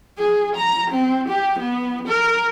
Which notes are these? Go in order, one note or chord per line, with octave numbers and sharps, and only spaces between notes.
G#4
A#5
C4
G4
B3
A#4